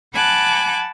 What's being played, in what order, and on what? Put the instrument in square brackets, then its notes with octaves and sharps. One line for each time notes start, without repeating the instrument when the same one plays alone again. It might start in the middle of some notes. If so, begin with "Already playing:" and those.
[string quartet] F#5 G#5 A5 B5 D6 F#6